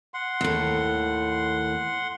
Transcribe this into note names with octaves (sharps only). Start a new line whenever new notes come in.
F#5 C6
D#2 A2